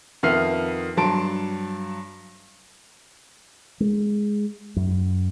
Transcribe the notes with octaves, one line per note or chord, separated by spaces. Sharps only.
F2 D#3 B3 E5 F6 C7
G2 F#3 A5 C6 D7
G#3
F#2